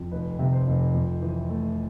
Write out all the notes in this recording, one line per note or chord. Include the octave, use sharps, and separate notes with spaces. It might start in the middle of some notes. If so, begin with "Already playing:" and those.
Already playing: F2
F1 B4
C3
C5
F1
F2
E3
A3